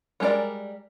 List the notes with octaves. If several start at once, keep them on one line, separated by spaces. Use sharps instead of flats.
G3 G#3 D#4 A#4 D5